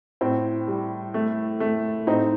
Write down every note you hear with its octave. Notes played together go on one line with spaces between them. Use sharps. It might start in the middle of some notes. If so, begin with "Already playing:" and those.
A2 C4
G3
A3
A3
A2 C4 D#4